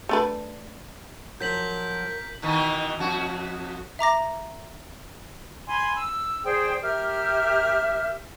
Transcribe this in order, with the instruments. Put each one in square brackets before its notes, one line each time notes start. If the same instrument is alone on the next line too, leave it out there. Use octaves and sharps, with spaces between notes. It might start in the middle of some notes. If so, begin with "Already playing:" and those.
[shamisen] A3 D4 B4
[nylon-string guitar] F3 F#3 [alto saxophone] A#4 [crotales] G6 B6 F#7
[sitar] B2 D#3 E3
F2 F#4
[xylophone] E5 A#5 D6 A#6
[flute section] G#5 B5 C6
E6
G#4 C5 D5 G5
G4 A#4 E5 F6